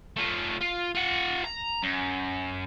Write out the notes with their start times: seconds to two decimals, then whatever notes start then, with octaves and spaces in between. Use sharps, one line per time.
0.17 A3 F4
0.61 F4
0.95 F4 F#5
1.45 A#5
1.83 F#2